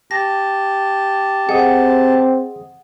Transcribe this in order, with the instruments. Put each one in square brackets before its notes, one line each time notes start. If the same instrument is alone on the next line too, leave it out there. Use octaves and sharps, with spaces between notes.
[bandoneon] G4 A5 [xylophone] A#6
[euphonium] C4 [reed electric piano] G#4 D#5 D#6 [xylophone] F#5